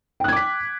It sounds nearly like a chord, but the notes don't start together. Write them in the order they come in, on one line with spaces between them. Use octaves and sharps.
G5 F#6 G#6 D6 B6